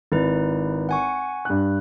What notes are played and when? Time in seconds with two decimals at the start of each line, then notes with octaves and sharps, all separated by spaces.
0.12 G#1 D#4 E4 B4
0.89 F#5 G#5 C#6
1.45 G2 F#6